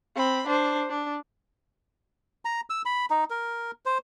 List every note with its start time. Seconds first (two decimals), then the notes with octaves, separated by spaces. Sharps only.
0.16 C4 B5
0.47 D4 C5
0.89 D4
2.45 A#5
2.70 E6
2.85 B5
3.10 D#4
3.30 A#4
3.86 C5